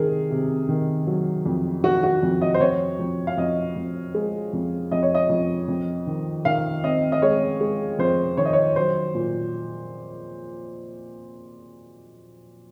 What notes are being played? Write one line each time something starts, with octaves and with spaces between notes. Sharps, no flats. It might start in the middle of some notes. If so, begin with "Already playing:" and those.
Already playing: C3 D#3 G#4 A#4
C3
D#3
F#3
F2
D#3 F#4
F#4
F2
D#5
C5
F2 C#5
F2
F5
F2 D#5
F2
G#3
F2
F2 D#5
C#5
D#5
F2
F2
D#3
D#3 F5
C4 D#5
D#5
G#3 C#5
G#3
F2 C5
D#3 C#5
D#5
C#5
F#3 C5
A#2